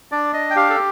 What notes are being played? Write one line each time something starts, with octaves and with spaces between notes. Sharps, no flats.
D4 D5
D#5
G5
G4 F5
A4